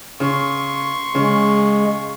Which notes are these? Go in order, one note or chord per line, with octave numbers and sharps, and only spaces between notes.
C#3 C6 C#6
C#3 G#3